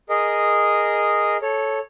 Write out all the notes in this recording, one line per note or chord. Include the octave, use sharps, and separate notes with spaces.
G#4 A#4 D#5
A4 C#5